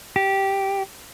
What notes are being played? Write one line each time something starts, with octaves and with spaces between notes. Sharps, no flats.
G4